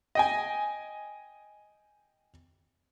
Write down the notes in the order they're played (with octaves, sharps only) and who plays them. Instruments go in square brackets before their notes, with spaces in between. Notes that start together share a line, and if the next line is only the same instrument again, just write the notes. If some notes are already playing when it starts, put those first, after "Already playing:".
[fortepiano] D#5 G5 G#5